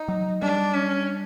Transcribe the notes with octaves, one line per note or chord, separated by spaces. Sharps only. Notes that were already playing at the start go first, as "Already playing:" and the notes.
Already playing: D#4
F#3
G3 D4
C#4